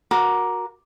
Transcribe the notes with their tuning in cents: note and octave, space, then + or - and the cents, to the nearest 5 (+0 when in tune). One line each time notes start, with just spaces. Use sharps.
F#4 -15 A#4 +10 D6 +0